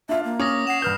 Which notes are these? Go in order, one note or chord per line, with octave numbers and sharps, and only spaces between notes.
D4 F4 E5
A#3
C#4 D6 D#6 A#6
F#5 C7 E7
G2 B4 F6 G6